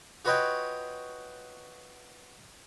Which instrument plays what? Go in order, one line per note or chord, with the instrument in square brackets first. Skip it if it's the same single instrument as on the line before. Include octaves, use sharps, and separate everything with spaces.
[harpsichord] F4 F#4 B4 C#5 D#5 G5